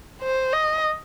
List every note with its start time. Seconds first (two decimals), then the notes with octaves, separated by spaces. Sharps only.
0.22 C5
0.53 D#5